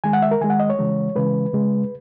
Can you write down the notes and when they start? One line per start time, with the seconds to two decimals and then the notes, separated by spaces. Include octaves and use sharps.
0.04 D#3 G#3 G#5
0.13 F#5
0.22 E5
0.31 A#4
0.41 D#3 G#3 G#5
0.50 F#5
0.60 D#5
0.70 C#5
0.79 C#3 E3 G#3
1.16 C#3 E3 G#3 B4
1.53 C#3 G#3